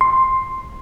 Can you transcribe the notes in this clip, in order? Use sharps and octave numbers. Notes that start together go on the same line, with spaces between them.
C6